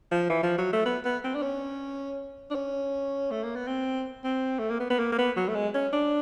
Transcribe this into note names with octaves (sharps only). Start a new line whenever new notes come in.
F3
E3
F3
F#3
A3
B3
B3
C4
D4
C#4
D4
C#4
A3
A#3
B3
C4
C4
A3
A#3
B3
B3
A#3
A#3
B3
F#3
A3
G#3
C#4
D4